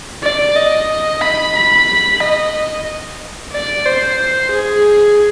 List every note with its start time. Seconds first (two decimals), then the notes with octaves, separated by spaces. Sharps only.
0.23 D5
0.56 D#5
1.21 B5
1.55 B5
2.21 D#5
3.52 D5
3.86 C5
4.51 G#4